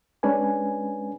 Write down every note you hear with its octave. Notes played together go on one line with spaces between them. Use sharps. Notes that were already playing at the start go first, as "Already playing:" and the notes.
G#3 C#4 D4 B4 G#5